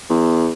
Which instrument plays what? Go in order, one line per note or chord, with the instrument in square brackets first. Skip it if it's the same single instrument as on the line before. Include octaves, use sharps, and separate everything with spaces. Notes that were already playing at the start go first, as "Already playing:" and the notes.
[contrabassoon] E2